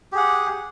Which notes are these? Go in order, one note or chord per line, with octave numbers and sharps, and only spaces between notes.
G4 G#4 F#5